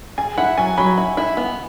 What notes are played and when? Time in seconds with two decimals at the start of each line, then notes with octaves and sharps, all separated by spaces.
0.18 G#4 G#5
0.38 E4 F#5
0.57 F#3 G#5
0.77 F#3 B5
0.98 E4
1.17 E4
1.37 B3